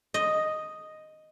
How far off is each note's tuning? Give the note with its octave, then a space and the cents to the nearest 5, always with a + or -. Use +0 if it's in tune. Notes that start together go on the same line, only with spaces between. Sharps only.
D#5 +0